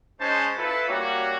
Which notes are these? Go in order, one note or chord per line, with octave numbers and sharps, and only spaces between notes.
G#3 C#4 D#4 C5 A5
E4 F4 A4 B4
G3 A#3 C#4 F#4 C#5